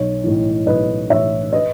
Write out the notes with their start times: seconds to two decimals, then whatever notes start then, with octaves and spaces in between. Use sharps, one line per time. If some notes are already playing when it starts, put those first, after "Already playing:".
Already playing: B1 C#5
0.24 A2 E3
0.66 B1 B4 D#5
1.09 A2 E3 C#5 E5
1.52 B4 D#5